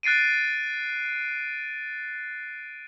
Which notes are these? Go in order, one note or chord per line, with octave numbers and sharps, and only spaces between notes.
F#6 A6 C7 D7 D#7